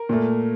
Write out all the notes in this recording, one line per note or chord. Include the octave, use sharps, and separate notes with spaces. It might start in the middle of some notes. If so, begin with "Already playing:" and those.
Already playing: A#4
A#2 A3